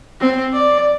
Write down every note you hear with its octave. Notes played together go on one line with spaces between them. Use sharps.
C4
D5